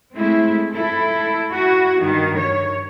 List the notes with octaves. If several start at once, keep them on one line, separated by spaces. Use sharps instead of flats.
G#3 A3 C4 E4
E4 A4
E4 F#4
G2 D#3
C#5